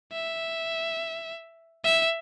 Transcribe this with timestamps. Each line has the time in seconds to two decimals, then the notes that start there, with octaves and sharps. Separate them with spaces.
0.12 E5
1.84 E5